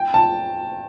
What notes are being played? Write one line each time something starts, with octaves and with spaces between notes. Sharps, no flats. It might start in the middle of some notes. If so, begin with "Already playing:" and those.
Already playing: G5
A5